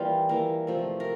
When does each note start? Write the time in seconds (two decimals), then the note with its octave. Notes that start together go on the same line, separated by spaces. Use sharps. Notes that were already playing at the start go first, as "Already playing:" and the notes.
Already playing: E3 G3 A#3 F4
0.29 E3 A#3 A#4
0.67 C3 F3 A3
1.00 A#4